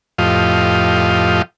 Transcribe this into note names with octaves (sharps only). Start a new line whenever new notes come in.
F2 A2 F3 G4 D#5 F5